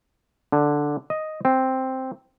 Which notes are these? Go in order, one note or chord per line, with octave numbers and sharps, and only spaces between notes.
D3
D#5
C4